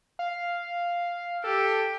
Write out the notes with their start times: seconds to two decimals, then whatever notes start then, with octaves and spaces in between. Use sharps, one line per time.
0.19 F5
1.44 G4 A4